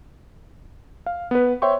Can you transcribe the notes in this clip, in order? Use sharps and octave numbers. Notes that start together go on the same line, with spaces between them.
F5
B3 B4
C5 C#5 E5 G5 C6 C#6